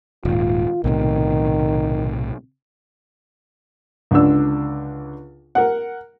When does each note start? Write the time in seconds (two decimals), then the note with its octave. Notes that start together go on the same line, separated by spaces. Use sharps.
0.25 D#1 G#2 F4
0.84 B1 A2 C3 D#3
4.11 C#2 D3 D4 E6
5.55 A#4 F#5